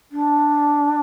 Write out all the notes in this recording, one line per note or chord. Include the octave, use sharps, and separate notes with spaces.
D4